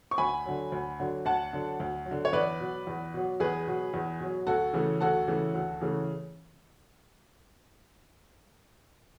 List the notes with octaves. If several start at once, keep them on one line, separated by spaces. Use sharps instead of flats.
C#6
D2 G#5 B5
D3 F#3
D2
D3 F#3
D2 F#5 A5
D3 F#3
D2
F#3
D3
C#5
E2 B4 D5
B2 F#3
E2
B2 F#3
E2 G#4 B4
B2 F#3
E2
B2 F#3
D2 F#4 A4
C#3 E3 A3
D2 F#4 A4
C#3 E3 A3
D2
C#3 E3 A3